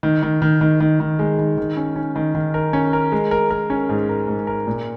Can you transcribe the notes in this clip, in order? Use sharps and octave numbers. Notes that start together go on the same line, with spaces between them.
D#3
D#3
D#3
D#3
D#3
D#3
G#3
D#3
D#3
C#4
C#4
D#3
D#3
A#4
C#4
A#4
G#3
A#4
A#4
C#4
G#2
A#4
G#2
A#4
A#2